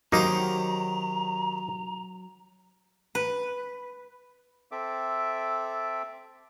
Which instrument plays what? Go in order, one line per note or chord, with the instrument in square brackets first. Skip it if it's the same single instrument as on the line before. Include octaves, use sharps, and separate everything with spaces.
[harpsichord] D#3 G4 C5 [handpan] F#3 F#4 [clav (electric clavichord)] A#3 D#4 [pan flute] A#5
[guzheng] B4
[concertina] C4 A4 E5 D6